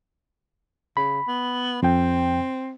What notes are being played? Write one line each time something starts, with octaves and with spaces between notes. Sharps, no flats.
C#3 B5
B3
F2 C4 G5